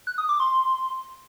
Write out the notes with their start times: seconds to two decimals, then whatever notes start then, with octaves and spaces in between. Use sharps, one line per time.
0.07 F#6
0.18 D#6
0.29 D6
0.40 C6